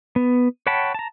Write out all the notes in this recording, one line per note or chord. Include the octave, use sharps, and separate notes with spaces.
B3
C#5 F#5 G5 A5 B5
A5 A#5